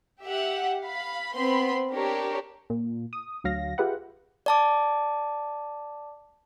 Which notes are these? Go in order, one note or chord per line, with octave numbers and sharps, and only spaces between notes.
G4 E5 F#5
F5 B5
B3 C4 B5 C6
D4 G4 A#4 C#5
A#2
D#6
D2 F#3 F5 A#6
F4 G4 G#4 B4 E5 F#5
D5 A5 D6